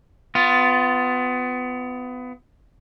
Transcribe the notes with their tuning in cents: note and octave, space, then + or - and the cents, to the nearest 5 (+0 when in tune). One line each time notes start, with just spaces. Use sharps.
B3 +25 F4 +0